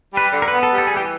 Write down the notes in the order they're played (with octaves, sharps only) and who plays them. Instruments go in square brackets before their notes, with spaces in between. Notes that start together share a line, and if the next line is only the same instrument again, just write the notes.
[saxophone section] G3 [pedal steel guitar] B4
[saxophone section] D3
[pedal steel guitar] A#4
[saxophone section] B3 [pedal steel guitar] B4
[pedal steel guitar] A4
[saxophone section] G3
[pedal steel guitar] A4
G#4
[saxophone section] E3 [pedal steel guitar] G4